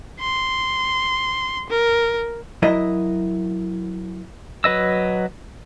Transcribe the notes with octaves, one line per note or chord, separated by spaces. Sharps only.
C6
A#4
F#3 E4 A#4 D#5
F#3 B4 D#5 E6